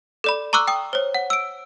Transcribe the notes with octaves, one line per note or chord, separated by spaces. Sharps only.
A4 D5 B5
A#5 C#6 D6 E6 F#6
G5 D#6
C5 C#5
F#5
E6 D7